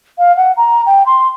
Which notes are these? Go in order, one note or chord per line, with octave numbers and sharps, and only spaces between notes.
F5
F#5
A#5
G5
C6